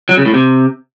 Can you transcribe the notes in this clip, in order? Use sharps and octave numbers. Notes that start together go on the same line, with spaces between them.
F#3
C#3
A2
C3